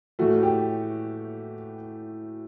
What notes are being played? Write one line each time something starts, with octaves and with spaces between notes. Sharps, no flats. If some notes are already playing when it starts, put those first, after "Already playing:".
A2 E3 A3 F#4
G4